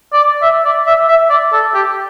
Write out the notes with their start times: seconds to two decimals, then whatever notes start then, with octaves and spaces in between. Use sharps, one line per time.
0.13 D5
0.42 E5
0.65 D5
0.87 E5
1.09 E5
1.30 D5
1.53 A4
1.74 G4